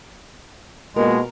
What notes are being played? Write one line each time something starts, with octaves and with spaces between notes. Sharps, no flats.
B2 G#3 A#3 F4 G4 A#4